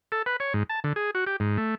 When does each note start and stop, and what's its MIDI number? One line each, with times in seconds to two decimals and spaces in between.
0.12 0.22 69
0.26 0.36 71
0.40 0.53 73
0.54 0.63 44
0.70 0.80 81
0.84 0.93 50
0.96 1.11 68
1.15 1.24 66
1.27 1.36 67
1.40 1.57 44
1.58 1.75 57